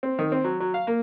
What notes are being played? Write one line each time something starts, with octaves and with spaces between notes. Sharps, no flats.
C4
D#3
C4
F#3
F#3
F5
A#3